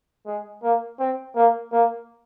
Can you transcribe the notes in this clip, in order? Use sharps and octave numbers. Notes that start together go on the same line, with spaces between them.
G#3
A#3
C4
A#3
A#3